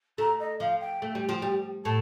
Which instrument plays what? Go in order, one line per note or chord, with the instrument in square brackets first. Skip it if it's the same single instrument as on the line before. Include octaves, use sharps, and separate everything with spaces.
[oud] A3 [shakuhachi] A#5
[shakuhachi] D#5
[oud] F3 [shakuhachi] F5
[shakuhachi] G5
[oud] A3
G3
F3
G3
[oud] A2 [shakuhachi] A5